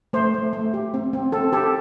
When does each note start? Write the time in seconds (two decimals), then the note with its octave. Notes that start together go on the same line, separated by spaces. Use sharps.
0.13 A3 C5
0.34 A3
0.53 A3
0.74 G4
0.94 C4
1.13 C4
1.32 C4 A4
1.52 G4 A4